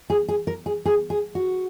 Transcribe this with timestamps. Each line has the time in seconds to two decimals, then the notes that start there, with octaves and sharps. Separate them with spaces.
0.10 G#4
0.28 G#4
0.47 A#4
0.66 G#4
0.85 G#4
1.10 G#4
1.35 F#4